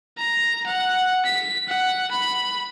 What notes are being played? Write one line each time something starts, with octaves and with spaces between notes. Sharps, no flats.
A#5
F#5
B6
F#5
B5